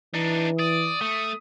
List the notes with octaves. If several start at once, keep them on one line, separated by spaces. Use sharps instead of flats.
E3 D4 D#4
D5 D#6
A3